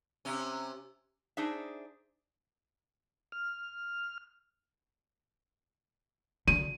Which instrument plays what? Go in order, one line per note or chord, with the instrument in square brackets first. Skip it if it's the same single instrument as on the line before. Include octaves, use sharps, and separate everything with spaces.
[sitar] C3 C#4
[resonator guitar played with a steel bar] D4 D#4 G#4 C5 E5
[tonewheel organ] F6
[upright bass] D3 [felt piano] D#7